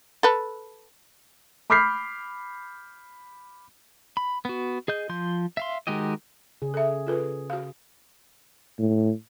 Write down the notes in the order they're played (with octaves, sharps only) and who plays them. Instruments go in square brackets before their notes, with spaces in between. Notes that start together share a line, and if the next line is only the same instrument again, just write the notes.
[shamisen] A4 B4
[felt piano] B5 D6 F6 G6 B6 C7
[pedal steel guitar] B5
B3 F#4
G#4 D#5 G6
F3 C6 G6
E5 F5 C6
D#3 G#3 F#4 G4 D#5
[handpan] C#3 G#4
[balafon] A4 E5
F4 A4 B4
F#4 F5
[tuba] A2